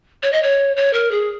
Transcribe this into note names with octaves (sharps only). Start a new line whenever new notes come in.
C#5
D#5
C#5
C#5
A#4
G#4